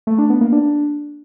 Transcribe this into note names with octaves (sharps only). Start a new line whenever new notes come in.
A3
D4
B3
A#3
D4